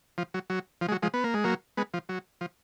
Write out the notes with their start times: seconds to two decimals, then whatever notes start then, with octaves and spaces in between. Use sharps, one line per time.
0.18 F3
0.34 F#3
0.50 F#3
0.81 F3
0.88 G#3
0.92 F#3
1.02 F3 G#3
1.14 B3
1.24 A#3
1.34 G#3
1.44 F#3 A#3
1.77 G#3 B3
1.94 F3
2.09 F#3
2.41 F3